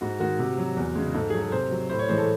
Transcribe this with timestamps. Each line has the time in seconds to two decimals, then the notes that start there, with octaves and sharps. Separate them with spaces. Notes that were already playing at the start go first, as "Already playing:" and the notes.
0.01 G#2 F#4
0.20 D#3 G#3 F#4
0.39 C3
0.58 F#3
0.77 E2
0.96 C#3 G#3
1.14 G#2 A4
1.30 F#3 G#4
1.41 A4
1.52 C3 C5
1.71 F#3
1.89 A2 C5
1.99 C#5
2.09 E3 G#3 C5
2.18 A4